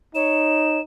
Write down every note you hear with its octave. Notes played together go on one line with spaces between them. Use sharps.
D#4 C#5 E7